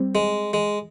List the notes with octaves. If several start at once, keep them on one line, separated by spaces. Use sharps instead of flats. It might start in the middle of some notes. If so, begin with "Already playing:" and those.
Already playing: G3 C4
G#3
G#3